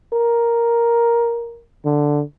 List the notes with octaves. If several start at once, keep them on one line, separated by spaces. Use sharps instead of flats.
A#4
D3